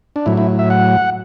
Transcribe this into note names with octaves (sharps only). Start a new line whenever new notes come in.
D4
A2 F#3 E4
E4
E5
F#5